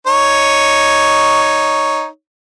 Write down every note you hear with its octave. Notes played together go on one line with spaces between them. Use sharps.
D#4 C#5